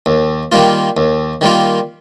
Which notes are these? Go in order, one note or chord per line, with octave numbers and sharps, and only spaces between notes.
D#2
D#3 G3 A#3 F4
D#2
D#3 G3 A#3 F4